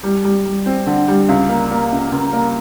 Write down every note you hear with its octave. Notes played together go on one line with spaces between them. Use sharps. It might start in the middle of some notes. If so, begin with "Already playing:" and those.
G3
G3
G3
C4
D3
G3
C#2
A#3
A#3
C#2
C#2
A#3